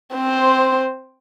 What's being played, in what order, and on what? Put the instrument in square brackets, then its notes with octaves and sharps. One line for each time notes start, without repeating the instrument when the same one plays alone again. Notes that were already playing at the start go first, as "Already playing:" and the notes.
[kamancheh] C4 C5